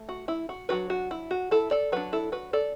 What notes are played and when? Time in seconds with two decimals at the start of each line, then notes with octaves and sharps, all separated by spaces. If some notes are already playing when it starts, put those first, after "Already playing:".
Already playing: A3
0.09 F#4
0.28 E4
0.49 F#4
0.69 F#3 D4 F#4 B4
0.90 F#4
1.11 E4
1.31 F#4
1.51 E4 A4
1.71 A4 D5
1.92 F#3 D4 F#4 B4
2.13 E4 A4
2.32 F#4 B4
2.53 A4 D5